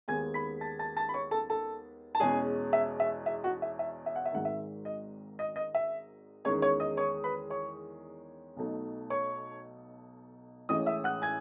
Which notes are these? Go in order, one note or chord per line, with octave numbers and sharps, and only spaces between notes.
D#2 D#3 G#3 B3 G#5 G#6
B5 B6
A5 A6
A5 A6
A5 A6
B5
C#5 C#6
A4 A5
A4 A5
A5
E2 B2 G#3 C#4 G#4 G#5
E5
E5
E5
F#4 F#5
E5
E5
E5
F#5
E5
G#1 G#2 D#3 F#5
E5
D#5
D#5
D#5
E5
E2 D#3 G#3 C#4 C#5 C#6
C#5 C#6
D#5 D#6
C#5 C#6
B4 B5
C#5 C#6
B1 B2 A3 D#4
C#5 C#6
A1 A2 E3 G#3 C#4 D#5 D#6
E5 E6
F#5 F#6
G#5 G#6